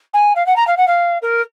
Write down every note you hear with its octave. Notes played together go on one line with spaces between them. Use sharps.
G#5
F5
F#5
A#5
F5
F#5
F5
A#4